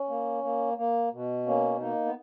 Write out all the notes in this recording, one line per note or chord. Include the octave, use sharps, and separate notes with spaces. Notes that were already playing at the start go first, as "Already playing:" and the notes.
Already playing: C#4
A#3
A#3
A#3
B2
A#3 C#4
A#3 D#4
B3